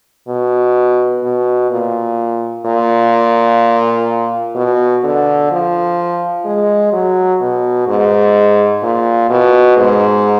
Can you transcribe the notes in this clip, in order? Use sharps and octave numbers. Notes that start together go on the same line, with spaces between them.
B2
B2
A#2
A#2
B2
D3
F3
G#3
F#3
B2
G#2
A#2
B2
G#2